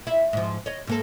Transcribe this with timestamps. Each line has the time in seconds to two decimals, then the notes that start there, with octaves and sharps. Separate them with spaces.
0.07 E4
0.33 G#2 F3
0.66 C#5 D#5
0.87 G#2 A#3 A4